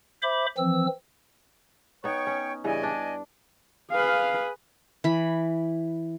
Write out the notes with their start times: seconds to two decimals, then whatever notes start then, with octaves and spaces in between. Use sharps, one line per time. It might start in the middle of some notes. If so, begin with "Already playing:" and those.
0.23 C5 E5 B5 D6
0.58 E3 F3 C4 E6
2.04 B3 D#4 C#5 G5 C#6
2.27 C#4
2.64 G2 C#3 E3 D5 D#5 G#5
2.83 D4
3.91 G#4 B4 F5
5.04 E3 B5